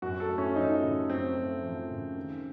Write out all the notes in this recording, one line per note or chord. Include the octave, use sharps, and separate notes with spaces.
F#2 F#4
A4
A3
C#4
F3 D#4
C#3
F#2 C4
A3
F3
C#3
D#3